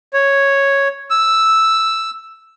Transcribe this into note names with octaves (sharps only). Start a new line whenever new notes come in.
C#5
E6